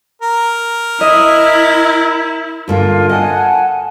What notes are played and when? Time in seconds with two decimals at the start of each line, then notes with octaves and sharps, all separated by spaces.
0.22 A#4
1.01 E4 D#5
2.68 G2 D3 A#3 F4
3.09 D#5 F#5 G#5 A5